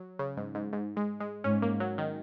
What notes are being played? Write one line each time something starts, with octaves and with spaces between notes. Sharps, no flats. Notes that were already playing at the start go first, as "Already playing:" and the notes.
Already playing: F#3
C#3
G#2
G#2
G#2
G#3
G#3
G#2 C#4
A#3
F#3
D#3